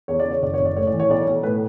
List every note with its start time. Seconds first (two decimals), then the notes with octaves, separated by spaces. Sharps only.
0.08 E2 C#5
0.20 D5
0.26 C#3
0.31 C#5
0.42 F#1 D5
0.54 C#5
0.59 F#1
0.65 D5
0.76 A2 C#5
0.87 D5
0.93 E3
1.00 C#5
1.09 B1 D5
1.21 C#5
1.27 B1
1.43 A2 B4